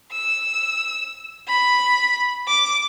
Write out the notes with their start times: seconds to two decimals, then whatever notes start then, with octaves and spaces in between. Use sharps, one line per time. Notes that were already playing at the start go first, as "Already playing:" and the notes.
0.12 E6
1.48 B5
2.48 D6